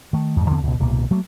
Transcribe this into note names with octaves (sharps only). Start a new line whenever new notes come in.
D#3 A3
E2 G#2
E2 D3 B3 C4
C#2 B2
D1 C2 B2 A#3
F#3 A3 A#3